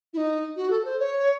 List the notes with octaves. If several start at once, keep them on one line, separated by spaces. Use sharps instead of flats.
E4
D#4
F#4
A4
C5
C#5